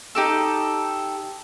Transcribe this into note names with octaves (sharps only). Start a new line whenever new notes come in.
D#4 G4 A4